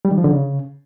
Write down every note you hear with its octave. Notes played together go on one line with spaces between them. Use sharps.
G3
D#3
F3
D3
C#3